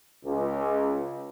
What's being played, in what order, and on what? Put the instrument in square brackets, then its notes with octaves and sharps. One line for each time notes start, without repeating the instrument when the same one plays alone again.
[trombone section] C#2